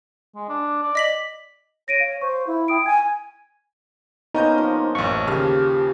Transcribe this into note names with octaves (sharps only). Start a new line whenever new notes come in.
G#3
D4
D5
D#5 B6 F#7
C#5 A#6 D7 D#7
F5
C5 C#6
E4 F5
G5 D#6 D7
G#5 G#6
A#3 B3 C#4 D#4 C5 D#5 G6
F3
A1 F#2 C#6
D#2 C#3 G4 F6